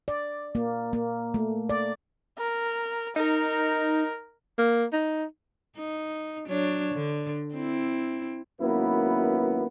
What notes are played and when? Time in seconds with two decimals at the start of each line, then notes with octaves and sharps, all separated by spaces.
0.08 D5
0.55 A#3
0.93 A#3
1.34 A3
1.69 D5
2.38 A#4
3.16 D#4 A#4
4.58 A#3
4.93 D#4
5.78 D#4
6.47 F#3 D4 C#5
6.94 D3
7.54 C4 E4
8.61 G#1 F#2 A#3 B3 E4 B4